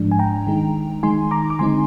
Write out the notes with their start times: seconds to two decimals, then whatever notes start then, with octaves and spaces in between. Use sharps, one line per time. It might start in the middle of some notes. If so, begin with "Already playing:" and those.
Already playing: G#2 F3 G#3 D4
0.11 G#5
0.19 G5 A#5
0.47 D#3 G#3 D#4
1.03 D#3 G#3 D#4 G#5 C6
1.31 A#5 D6
1.50 D6
1.59 D3 G#3 C4 D#4 G#5 C6